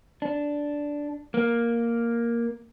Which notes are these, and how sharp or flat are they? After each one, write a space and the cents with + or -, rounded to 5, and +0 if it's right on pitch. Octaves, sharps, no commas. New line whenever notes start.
D4 -5
A#3 +5